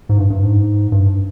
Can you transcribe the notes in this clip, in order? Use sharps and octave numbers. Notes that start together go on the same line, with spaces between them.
G#2
G2
G2
G#2
G2